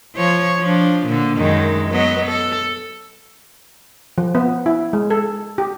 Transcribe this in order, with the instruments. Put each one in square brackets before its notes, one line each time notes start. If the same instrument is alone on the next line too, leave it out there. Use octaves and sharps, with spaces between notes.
[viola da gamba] F3 C#5
F3 D4
A#2 D3
F#2 D#3 G#3
F#3 B3 D#5
A4
[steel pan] F3
B3
E4
G#3
A4
G4